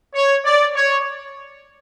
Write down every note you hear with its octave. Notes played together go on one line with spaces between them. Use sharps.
C#5
D5
C#5